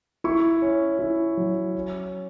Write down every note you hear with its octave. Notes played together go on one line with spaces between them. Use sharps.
E4 C#6
C#4
E4
F#3
C#4